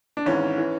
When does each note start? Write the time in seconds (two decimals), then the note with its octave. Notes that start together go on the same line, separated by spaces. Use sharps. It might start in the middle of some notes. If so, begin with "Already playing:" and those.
0.17 D4
0.26 G#1 G#2 E3 C#4
0.58 E3